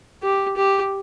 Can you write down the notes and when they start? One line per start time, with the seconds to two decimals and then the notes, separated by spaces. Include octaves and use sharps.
0.23 G4
0.56 G4